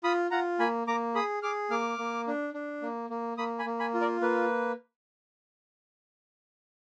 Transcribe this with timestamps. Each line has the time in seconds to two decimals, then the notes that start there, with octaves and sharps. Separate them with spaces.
0.04 F4 B5 D#6
0.31 F4 F#5 A#5
0.59 A#3 G#5 B5
0.87 A#3 A#5 D6
1.15 G#4 B5 D#6
1.42 G#4 D6 F6
1.70 A#3 D6 F6
1.98 A#3
2.27 D4
2.54 D4
2.82 A#3
3.10 A#3
3.37 A#3 B5 D#6
3.59 G#5 B5
3.65 A#3
3.80 G#5 B5
3.94 F4
4.01 A#4 D5
4.21 A#3 B4